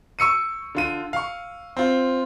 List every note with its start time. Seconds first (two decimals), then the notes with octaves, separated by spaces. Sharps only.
0.19 C#6 E6 C#7 D#7
0.75 D3 F4 D#7
1.13 F5 C#6
1.77 C4 F4